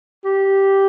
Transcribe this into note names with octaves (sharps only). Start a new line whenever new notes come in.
G4